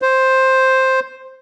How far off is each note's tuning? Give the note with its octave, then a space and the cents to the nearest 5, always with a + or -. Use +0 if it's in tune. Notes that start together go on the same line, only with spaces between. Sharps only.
C5 +5